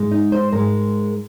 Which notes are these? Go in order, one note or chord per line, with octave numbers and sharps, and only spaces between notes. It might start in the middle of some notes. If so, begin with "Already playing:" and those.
Already playing: G#2 G#3
D#4
C5
G#2 G#3 A#4